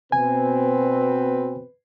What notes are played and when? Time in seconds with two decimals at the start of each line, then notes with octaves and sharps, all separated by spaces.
0.12 B2 C4 B4 G#5